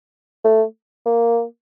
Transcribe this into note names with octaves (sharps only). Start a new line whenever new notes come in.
A3
A#3